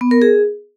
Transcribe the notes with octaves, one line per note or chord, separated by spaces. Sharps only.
B3
A#4
G#4